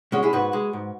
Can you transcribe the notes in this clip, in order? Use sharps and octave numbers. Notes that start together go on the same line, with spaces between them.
G#3 C#4 F#4
E4 G#4
G#2 F#4 B4
G#3
G#2